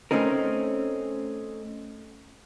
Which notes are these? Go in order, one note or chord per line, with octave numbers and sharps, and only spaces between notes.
A3 C4 C#4 D#4 A#4